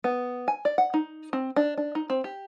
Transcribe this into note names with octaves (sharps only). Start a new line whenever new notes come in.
B3
G#5
D5
F#5
D#4
C4
D4
D4
D#4
C4
G4